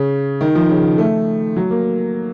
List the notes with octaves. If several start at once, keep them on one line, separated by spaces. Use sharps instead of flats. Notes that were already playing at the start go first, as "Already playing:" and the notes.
Already playing: C#3
D#3
F3
C#3
A3
F#3
A#3